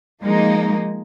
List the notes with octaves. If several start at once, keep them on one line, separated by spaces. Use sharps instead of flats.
F3 G#3 A#3 D#4